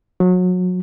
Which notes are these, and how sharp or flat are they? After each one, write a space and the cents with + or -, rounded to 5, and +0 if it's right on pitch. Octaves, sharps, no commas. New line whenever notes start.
F#3 -30